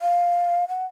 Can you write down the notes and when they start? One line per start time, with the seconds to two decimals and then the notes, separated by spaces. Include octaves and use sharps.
0.02 F5
0.68 F#5